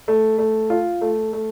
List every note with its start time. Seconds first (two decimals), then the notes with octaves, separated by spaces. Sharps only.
0.08 A3
0.38 A3
0.70 F4
1.01 A3
1.33 A3